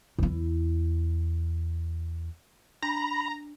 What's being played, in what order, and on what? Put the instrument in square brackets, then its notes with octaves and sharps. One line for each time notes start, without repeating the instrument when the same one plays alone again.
[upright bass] E2 E4
[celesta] D4 [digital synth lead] A#5 [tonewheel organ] B5